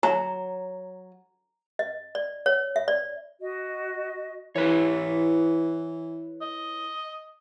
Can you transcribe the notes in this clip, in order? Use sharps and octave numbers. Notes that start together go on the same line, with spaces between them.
F#3 A#5
D#5
D5
C#5
E5
D5
F#4 D#5
E3 E4 B4 C#5
D#5